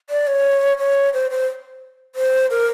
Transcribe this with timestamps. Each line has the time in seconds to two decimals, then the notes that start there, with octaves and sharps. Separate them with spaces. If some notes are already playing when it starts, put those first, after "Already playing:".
0.10 D5
0.27 C#5
0.79 C#5
1.13 C5
1.31 C5
2.15 C5
2.51 A#4